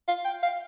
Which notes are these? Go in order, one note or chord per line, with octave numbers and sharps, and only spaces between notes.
F5
G5
F5